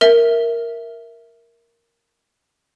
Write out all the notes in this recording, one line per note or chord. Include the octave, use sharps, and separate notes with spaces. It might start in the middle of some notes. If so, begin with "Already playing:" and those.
A#4 E5